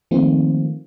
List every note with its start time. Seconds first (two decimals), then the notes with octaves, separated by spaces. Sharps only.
0.11 D#3 F3 A3 A#3 C4 F4